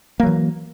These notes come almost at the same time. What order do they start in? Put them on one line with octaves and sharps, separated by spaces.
A#3 F#3 E3